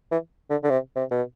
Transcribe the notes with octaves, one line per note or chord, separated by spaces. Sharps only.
E3
D3
D3
C3
C3
B2